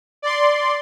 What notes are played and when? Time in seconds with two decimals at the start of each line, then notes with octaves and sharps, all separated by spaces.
0.22 D5 C6